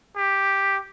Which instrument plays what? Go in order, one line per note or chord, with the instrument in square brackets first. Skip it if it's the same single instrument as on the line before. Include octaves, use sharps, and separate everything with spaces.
[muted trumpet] G4